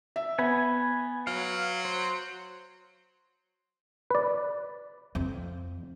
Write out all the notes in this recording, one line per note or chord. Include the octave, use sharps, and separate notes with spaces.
E5
B3 G#5 B5
F#3 F5
C5
B4 D5
F2